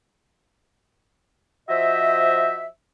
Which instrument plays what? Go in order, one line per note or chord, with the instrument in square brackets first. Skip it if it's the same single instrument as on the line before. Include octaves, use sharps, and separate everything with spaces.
[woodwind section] F3 F#4 C5 D#5 E5